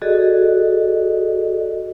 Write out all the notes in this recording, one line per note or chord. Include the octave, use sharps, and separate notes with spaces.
F#4 G#4 A4 D5 D#5